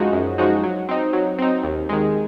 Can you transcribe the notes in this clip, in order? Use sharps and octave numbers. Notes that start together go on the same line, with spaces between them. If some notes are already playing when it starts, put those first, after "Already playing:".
Already playing: F#2 F3 G#3 D#4 F#4
F#2
F3 G#3 D#4 F#4
F#3
C4 D#4
F#3
C4 D#4
D#2
D#3 G#3